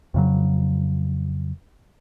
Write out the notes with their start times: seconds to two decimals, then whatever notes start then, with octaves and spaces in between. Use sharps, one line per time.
0.14 F2 C#3 F#3